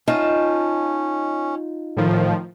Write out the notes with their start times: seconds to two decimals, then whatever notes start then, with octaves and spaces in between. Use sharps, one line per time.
0.08 C#4 D#4 F4 D#5 A5
1.97 A2 D#3 F3